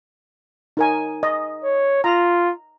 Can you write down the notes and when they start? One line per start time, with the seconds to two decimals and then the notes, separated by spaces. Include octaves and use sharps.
0.77 D#4 A#4 G#5
1.23 D#5
1.64 C#5
2.04 F4 A#5